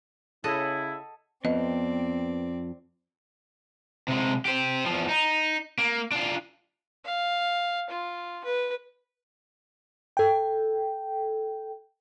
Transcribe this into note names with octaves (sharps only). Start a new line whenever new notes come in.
C#3 E4 A4 D#5 F#5
F2 B3 C4 D5 D#5
C3 G#3
G4 C5
E2 F3
D#4
A#3
D4 F4
F5
F4
B4
A4 G5